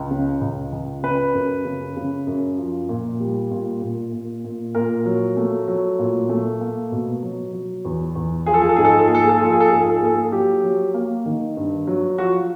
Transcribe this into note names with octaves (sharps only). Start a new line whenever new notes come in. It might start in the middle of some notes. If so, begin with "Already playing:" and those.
Already playing: C#2
C#3
C#2
C#2
C#3 B4
F#2
C#3
C#3
F#2
F3
A#2
G3
A#2
A#2
A#2
A#2
A#2 A#4
F#3
A3
F#3
A#2
A3
A#3
B2
F#3
F#3
E2
E2
F3 G#4
A4
G#4
A4
G#2 G#4
A4
G#4
A4
A#3 G#4
A4
G#4
A4
F3 G#4
A4
G#4
A4
G#2 G#4
A4
G#4
A4
G#4
A#3 A4
G#4
F#3 G4
F#3
A#3
D#3
G2
F#3
F3 F#4